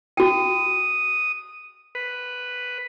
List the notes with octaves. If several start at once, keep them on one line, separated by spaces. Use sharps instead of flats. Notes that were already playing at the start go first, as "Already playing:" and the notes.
F#4 G5 D#6
B4